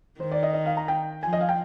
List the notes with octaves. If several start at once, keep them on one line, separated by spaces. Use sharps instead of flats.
D#3 C5
D5
D#5
D#5
F5
A#5
G5
F3 G#5
D#5
F5
G5